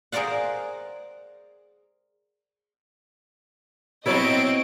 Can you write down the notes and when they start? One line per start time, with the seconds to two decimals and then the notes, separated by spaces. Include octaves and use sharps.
0.12 G#4 A#4 C5 D5 F5 F#5
4.06 F#3 B3 C4 E4 C#5 D#5 D7